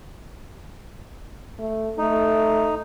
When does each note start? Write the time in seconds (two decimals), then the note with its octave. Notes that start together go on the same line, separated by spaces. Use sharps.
1.59 A3
1.98 A3 D#4